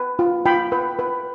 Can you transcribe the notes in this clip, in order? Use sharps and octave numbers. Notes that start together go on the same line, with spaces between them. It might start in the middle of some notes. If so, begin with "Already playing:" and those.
Already playing: B4
F4
F4 G5 B5
B4
B4